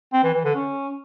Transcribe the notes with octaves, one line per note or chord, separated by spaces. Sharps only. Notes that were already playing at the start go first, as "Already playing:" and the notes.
C4
E3
E3
D3
C#4